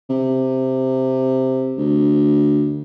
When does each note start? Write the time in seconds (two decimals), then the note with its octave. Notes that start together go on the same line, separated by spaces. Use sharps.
0.10 C3
1.78 D2